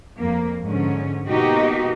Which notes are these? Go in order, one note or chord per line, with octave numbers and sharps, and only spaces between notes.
F2 A#3
G#2 D3 F3 C#4
B2 A#3 D#4 F#4 G4